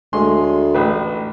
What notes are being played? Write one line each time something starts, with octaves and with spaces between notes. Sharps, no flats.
D2 G#3 C6
A1 B4